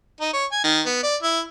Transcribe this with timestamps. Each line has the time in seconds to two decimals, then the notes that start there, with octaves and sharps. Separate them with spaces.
0.21 D#4
0.34 C#5
0.52 G#5
0.64 D#3
0.86 B3
1.03 D5
1.23 E4